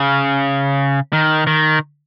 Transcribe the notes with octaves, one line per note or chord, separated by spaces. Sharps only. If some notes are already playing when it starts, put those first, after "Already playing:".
Already playing: C#3
D#3
D#3